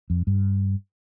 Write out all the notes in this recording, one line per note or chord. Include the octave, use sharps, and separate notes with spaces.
F2
G2